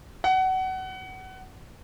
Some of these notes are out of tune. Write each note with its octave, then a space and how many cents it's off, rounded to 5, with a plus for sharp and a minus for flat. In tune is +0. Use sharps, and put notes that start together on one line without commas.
F#5 +25